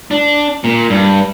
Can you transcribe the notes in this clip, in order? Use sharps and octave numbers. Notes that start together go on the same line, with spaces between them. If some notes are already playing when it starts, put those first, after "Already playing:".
D4
A#2
G2